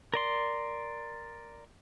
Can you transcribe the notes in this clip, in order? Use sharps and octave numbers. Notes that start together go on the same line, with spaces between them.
A#4 D5 C6